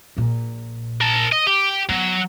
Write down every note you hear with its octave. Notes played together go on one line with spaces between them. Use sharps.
A#1 A#2
A#4 A5
D#5
G4
F#3 B3